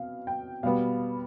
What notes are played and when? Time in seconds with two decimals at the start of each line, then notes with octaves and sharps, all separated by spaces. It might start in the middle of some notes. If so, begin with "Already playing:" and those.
Already playing: B2 C4 F5
0.27 G5
0.63 B2 G3 B3 F5